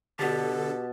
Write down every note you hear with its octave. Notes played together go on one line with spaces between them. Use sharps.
B2 D3 G4 A4 A5